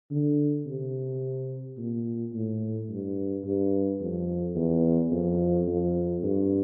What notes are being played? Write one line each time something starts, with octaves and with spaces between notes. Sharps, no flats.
D3
C3
A#2
A2
G2
G2
F2
E2
F2
F2
G2